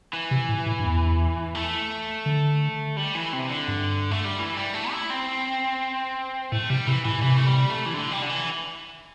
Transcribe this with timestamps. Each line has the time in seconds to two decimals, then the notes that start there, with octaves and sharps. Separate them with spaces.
0.13 E3
0.31 C3
0.49 A2
0.66 A2
0.79 G2
0.84 E2
1.55 A3
2.26 D3
2.97 G3
3.15 E3
3.33 C3
3.50 D3
3.68 G2
4.11 A3
4.25 G3
4.39 E3
4.57 G3
4.74 A3
4.92 E4
5.10 C4
6.52 A2 A3
6.70 C3 G3
6.87 C3 E3
7.05 A2 E3
7.18 A2
7.22 C3 E3
7.37 A3
7.46 G3
7.70 A3
7.86 E3
7.94 D3
8.12 G3
8.22 D3
8.29 E3